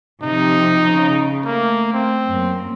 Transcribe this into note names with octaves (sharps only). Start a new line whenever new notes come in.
C3 F3 D#4
C#3
A3 A#3
C4
F#2 A#3